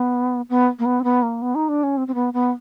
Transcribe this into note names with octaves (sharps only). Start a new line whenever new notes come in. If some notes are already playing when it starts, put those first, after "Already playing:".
Already playing: B3
B3
A#3
B3
C4
B3
A#3
B3
D#4
D4
C#4
C4
C4
B3
B3